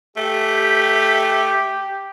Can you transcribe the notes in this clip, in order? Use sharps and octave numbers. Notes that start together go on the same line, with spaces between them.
A3 G4